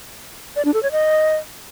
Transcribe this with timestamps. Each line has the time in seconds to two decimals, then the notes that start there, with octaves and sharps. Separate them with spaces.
0.56 D5
0.65 D4
0.74 A4
0.83 C#5
0.92 D#5